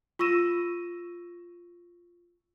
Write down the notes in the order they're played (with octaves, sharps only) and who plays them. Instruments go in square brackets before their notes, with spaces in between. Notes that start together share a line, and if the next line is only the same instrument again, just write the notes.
[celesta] F4 C#6 E6 A#6 D#7 E7